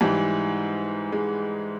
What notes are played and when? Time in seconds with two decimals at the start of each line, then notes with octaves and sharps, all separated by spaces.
0.01 G#2 E3 G3
1.12 G#3